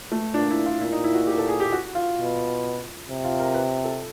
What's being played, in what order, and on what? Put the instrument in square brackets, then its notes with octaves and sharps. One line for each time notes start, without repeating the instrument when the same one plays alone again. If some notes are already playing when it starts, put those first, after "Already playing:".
[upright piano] A3
[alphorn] A#2 [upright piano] D4
[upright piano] E4
F4
[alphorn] A#2 [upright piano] E4
[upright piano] D#4
E4
F#4
G4
A4
G#4
G4
F#4
F4
[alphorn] B2
C3
[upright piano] F4
A#4
B4
A4